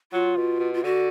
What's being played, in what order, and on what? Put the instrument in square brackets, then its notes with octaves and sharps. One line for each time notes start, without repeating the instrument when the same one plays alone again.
[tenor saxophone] F#3 [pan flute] F4
[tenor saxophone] B2
B2
[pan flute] F4
[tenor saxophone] D3 [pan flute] F#4